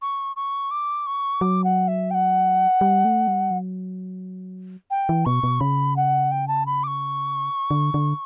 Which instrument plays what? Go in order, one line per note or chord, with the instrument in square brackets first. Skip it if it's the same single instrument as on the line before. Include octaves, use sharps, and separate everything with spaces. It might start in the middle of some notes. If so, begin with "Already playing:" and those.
[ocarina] C#6
C#6
D6
C#6
[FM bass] F#3 [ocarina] D6
[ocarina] F#5
E5
G5
F#5
[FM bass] G3
A3
G3
F#3
[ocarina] G5
[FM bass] E3
[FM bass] B2 [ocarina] C#6
[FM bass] B2
[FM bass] C#3 [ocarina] B5
[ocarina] F#5
G5
A5
B5
D6
C#6
[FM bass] D3
D3